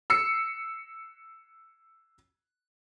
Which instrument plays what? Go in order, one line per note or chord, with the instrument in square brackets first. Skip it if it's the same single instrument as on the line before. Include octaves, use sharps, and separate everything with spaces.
[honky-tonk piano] E6 C7 C#7